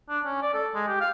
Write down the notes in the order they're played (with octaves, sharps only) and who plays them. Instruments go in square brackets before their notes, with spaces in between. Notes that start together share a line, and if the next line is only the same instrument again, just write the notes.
[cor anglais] D4
C#4
D5
A4
G#3
G4
F5